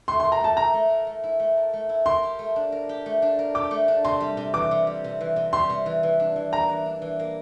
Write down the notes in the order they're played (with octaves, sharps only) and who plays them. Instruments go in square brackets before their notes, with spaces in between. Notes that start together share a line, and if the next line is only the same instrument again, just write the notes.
[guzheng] A3 [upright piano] C6
[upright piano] C6
[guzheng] A#4
[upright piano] A#5
[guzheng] A3 [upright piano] A5
[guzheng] E4 [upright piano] A#5
[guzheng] A3
A#4
A3
E4
A3
A#4
A3
E4
[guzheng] A#4 [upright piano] C6
[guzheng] G4
A3
D4
A#4
G4
A3
D4
A#4
[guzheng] G4 [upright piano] D6
[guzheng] A3
D4
[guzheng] C3 [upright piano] C6
[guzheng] G3
C3
[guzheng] E3 [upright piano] D6
[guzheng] C3
G3
C3
E3
C3
[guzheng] G3 [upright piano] C6
[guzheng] C3
E3
E3
D4
E3
[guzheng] A#3 [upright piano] A#5
[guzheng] E3
D4
E3
A#3